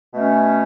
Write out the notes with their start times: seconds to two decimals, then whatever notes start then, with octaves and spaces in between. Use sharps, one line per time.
0.14 B2 A3 C#4